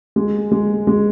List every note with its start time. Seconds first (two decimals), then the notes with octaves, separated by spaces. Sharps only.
0.16 G#3
0.52 G#3
0.87 G#3